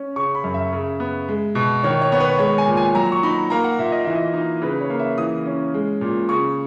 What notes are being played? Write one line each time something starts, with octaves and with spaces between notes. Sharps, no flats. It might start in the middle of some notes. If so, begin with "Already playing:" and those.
Already playing: C#4
C#3 C#6
B5
F#2
E5
C#3
B3
G#3
B2
D#3 C#5
C#5
B3 C#5
B4
G#3 C#5
G#5
A#2
G#5
F#3 A#5
C#6
D#4 B5
A#3 A#5
F#5
A#2 E5
D#5
E3 E5
D#5
D#4
C#3 B4
C#5
A#3
E5
E3 D#6
C#4
G#3
A#2
C#3 C#6